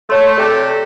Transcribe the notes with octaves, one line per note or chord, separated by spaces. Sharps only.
A3 C#5 C6
C3 G4 A4 D5